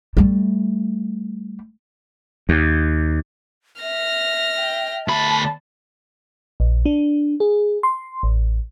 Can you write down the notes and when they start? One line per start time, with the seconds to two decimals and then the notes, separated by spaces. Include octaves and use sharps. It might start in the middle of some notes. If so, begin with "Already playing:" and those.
0.17 G3 A3
2.49 D#2
3.82 E5 F6 A#6
4.59 G5
5.08 D2 A5 B5
6.60 A#1
6.86 D4
7.40 G#4
7.83 C6
8.23 A1